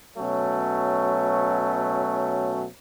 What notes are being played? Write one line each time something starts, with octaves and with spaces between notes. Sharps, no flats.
B2 F#3 A3 C#4